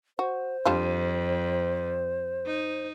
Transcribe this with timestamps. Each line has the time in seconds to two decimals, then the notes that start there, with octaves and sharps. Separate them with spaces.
0.19 F#4 C5
0.65 F2 G3 D4 F4
2.46 D#4